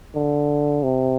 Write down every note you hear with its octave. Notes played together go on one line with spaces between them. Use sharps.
D3
C3